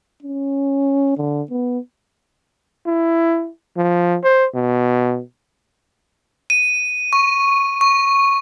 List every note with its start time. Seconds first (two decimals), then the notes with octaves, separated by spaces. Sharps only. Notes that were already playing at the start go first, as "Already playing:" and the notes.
0.22 C#4
1.17 D3
1.50 B3
2.86 E4
3.76 F3
4.23 C5
4.54 B2
6.50 D#7
7.13 C#6
7.81 C#6